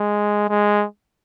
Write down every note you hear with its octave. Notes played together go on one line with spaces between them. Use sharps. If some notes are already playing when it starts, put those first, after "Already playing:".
Already playing: G#3
G#3